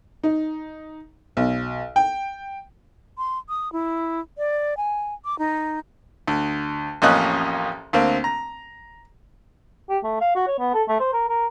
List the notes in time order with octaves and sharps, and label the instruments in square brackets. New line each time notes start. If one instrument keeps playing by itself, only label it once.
[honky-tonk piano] D#4
B1
G5
[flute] C6
D#6
E4
D5
G#5
D6
D#4
[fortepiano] D2
A1 F2 A#3 C#4 D#5 F#6
D2 A#3 C4
A#5
[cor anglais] G4
A3
F5
F#4
C#5
B3
A4
A3
C5
A#4
A#4